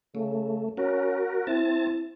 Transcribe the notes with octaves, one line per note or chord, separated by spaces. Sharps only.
C#3 A3
C#4 F#4 A#4
C4 E4 A5